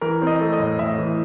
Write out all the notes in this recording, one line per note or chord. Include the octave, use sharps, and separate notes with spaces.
E3 A#4
C4
D#5
A3
D#5
A2
A2 E5
E3